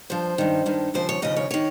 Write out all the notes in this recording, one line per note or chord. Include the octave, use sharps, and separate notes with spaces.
G2 F3 C5
G2 D#3
G2 D#3
D#2 C#3 F3 C5
C#5
D#2 C#3 F3 D#5
C#5
D#3 C#5